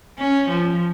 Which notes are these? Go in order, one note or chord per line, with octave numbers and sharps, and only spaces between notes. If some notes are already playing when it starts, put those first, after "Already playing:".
C#4
F3